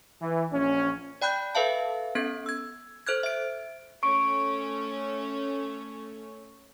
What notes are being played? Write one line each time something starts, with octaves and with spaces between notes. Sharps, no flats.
E3
A#1 C#4
D5 G5 B5 F#6 G6
A4 B4 E5 F5 A5
B3 C#4 A4 G#6
E6 G#6
A4 C5 F6 F#6 G#6
E5 D7
A3 C#4 C#6 D7